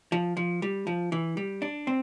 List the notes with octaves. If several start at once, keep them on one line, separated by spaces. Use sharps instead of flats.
F3
F3
G3
F3
E3
G3
D4
C4